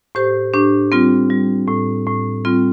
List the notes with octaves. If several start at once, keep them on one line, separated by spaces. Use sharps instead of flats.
A2 G4 C5
A2 D4 G4
G3 C4 F4
G3
A2
A2
G3 C4 F4